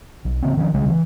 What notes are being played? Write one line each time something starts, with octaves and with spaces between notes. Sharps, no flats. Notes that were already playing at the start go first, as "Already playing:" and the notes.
B1
C#3 A#3 C4
D#3 F3 A#3 C#4
C2 C#3 G3 G#3
E3